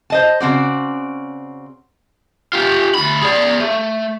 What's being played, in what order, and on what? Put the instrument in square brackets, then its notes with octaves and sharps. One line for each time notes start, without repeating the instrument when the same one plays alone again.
[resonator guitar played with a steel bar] C5 D#5 A5
C#3 C4 F#4 D5
[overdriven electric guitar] F4 G4
D2 B5
G#4 D5
A3